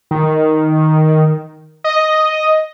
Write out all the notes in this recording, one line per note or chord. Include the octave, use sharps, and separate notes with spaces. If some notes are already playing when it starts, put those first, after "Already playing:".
D#3
D#5